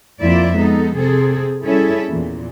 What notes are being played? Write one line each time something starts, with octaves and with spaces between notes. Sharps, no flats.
F2 A#3 E4 F4 D5 E5
G#3 B3 D#4 A4
C3 C4 G#4 A4
G3 C#4 E4 G#4 A4 E5
E2 A#2 E3